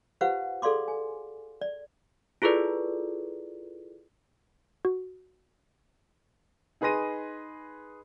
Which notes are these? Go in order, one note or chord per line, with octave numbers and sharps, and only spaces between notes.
F4 G4 B4 C5 F5 F#5
G#4 A4 D5 F5 C6 D6
G#5
D5
E4 F4 G#4 A4 B4 D5
F#4
D#4 G#4 B4 C6 A#6 D#7